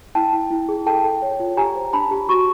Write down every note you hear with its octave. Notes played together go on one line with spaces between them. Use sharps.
E4 G5 A5
E4
E4
G#4
A4 G5 A5
A4
C#5
F4
G4 G#5 A#5
C5
D4 A5 B5
G4
F#4 B5 C#6